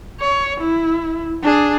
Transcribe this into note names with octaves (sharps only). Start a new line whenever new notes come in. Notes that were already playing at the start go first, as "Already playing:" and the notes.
C#5
E4
D4 G#4